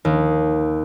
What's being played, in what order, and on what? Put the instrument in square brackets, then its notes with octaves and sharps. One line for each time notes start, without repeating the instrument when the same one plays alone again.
[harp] D#2